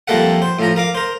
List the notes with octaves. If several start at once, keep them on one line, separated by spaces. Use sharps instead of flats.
F2 G3 A#3 A4 E5 F#5
C5
A2 F3 A#5
A#4 F5 D6
A#4 C5